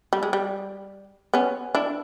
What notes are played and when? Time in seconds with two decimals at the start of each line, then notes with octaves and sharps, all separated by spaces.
0.13 G3
0.23 G#3
0.33 G3
1.34 B3 C#4
1.75 D4 E4